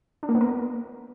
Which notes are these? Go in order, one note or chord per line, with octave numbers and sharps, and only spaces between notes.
D4
A#3
B3
A#4
B3